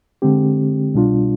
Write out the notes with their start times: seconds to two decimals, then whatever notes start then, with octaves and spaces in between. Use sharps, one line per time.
0.22 D3 G#3 C4 G4
0.94 C2 B2 G3 D4 F4